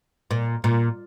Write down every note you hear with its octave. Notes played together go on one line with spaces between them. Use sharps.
A#2
A#2